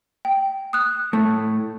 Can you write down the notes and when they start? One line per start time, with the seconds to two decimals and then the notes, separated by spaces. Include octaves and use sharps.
0.25 G5
0.73 D#6 F#6
1.13 A2 A3